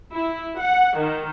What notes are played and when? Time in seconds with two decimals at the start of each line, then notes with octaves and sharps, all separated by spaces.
0.14 E4
0.59 F#5
0.98 D#3